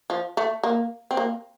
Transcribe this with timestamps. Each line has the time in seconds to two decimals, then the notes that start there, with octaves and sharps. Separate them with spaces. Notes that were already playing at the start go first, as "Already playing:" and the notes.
0.10 F3
0.37 A3
0.63 A#3
1.11 C4
1.17 A#3